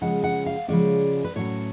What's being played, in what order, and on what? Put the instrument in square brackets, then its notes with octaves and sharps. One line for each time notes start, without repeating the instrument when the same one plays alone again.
[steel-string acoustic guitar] C#3 F3 G#3 C#4 F#5
F#5
F5
C#3 F3 G#3 C#4 D5
B4
A2 F#3 C#4 C#5